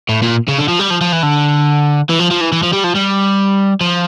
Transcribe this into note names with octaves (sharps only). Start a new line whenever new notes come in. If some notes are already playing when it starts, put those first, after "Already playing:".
A2
A#2
C#3
D3
F3
G3
F3
F3
E3
D3
E3
F3
F3
E3
E3
F3
G3
F3
G3
F3